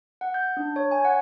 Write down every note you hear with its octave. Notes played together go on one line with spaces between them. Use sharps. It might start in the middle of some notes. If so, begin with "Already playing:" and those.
F#5
G6
D4
C#5
G#5
F#5